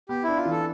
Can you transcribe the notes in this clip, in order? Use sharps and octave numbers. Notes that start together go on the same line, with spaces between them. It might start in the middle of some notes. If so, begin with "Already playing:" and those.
B3 G4
D4 E4
F4
E3
A4